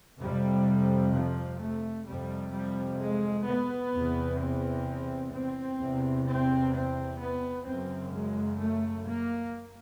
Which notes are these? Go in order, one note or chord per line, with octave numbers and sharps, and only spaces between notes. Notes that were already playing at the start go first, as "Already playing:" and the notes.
F2 C3 G3
F3
A3
F2 C3 G3
G3
G#3
B3
E2 C3
C4
C4
E2 C3
C4
C4
B3
F#2 C#3 C4
G#3
A3
A#3